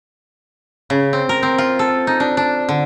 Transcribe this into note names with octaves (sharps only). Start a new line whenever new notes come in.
C#3
C4
A#4
C4
F4
A4
D#4
D4
D4
D3